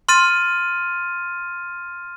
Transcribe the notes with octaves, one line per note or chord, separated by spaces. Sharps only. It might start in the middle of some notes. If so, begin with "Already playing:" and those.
C6 F6 A6 D#7